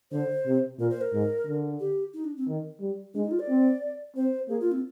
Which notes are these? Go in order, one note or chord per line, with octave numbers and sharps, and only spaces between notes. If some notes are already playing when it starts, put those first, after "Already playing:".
D3 C5
C3
A#2 A#4
C5
A#4
G#2
D3
G4
D#4
D4
C4
D#3
G3
G#3 D4
D#4
F4
D5
C4
C4 C5
A#3 G#4
F4
C4